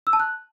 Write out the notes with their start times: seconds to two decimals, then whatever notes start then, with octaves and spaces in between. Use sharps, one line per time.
0.07 E6
0.13 A5
0.20 F#6